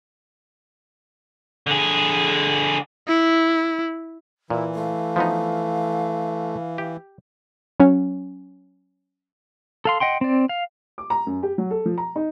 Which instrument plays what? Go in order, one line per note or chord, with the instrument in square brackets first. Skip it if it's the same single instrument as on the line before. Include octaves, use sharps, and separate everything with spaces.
[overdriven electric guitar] D3 G#4
[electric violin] E4
[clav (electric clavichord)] A#2 [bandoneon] E3 [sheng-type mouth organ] E4
[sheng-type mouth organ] A3 [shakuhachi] F5
[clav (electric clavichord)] F3 B3 D#4
G4
[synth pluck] F#3 C#4
[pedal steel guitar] A4 F5 C6
D#5 F#5 G5 C6
C4 D5
F5
[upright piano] D6
A#5
F#2
G4
F#3
A4
F3
A#5
D#4